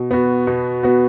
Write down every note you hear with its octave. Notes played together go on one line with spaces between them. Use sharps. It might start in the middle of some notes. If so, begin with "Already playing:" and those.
Already playing: B2
B3 F#4
B2
B3 F#4